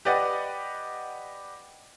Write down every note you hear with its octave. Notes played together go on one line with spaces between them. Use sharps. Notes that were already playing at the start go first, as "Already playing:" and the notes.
G4 B4 D5 D#5 F#5